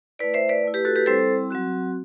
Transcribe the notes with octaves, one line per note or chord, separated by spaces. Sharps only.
A3 E4 B4 D5
C5 E5
B4 D5
A3 E4
G4 B4
F#4 A4
G4 B4
G3 C4 E4 A4 C5
F#3 C4 F#4